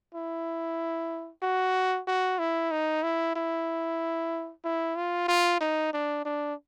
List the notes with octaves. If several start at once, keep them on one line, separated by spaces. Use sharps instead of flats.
E4
F#4
F#4
E4
D#4
E4
E4
E4
F4
F4
D#4
D4
D4